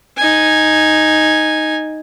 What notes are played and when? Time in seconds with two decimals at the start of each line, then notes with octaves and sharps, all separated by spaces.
0.17 D#4 G#5